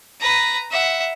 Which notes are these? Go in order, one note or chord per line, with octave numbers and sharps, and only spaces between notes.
B4 A#5
E5 F#5